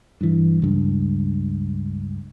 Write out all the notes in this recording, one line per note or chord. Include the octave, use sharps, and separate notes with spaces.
G2 E3
C#2 G2